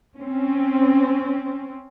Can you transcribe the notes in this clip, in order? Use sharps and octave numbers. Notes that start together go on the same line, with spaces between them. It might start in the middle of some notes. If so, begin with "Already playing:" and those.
C4 C#4